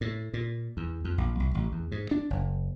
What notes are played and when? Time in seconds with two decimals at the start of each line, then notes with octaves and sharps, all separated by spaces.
0.01 A2
0.34 A#2
0.77 E2
1.05 F2
1.18 A#1
1.40 C2
1.54 A1
1.72 E2
1.92 G#2
2.11 D4
2.30 F#1